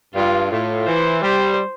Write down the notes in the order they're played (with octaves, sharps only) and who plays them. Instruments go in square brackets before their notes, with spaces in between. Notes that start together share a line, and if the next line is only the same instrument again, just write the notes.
[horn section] G2 [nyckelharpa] F4
[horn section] A2 [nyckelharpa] F4
[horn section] E3 [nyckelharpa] C5
[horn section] G3 [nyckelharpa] C5